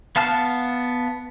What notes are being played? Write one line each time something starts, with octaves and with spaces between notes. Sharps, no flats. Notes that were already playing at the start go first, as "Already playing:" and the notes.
B3 F5 A5 F6